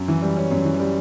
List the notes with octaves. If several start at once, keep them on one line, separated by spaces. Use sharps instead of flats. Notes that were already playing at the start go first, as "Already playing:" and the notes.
Already playing: F#2
E3
G3
C#4
F#2
E3
G3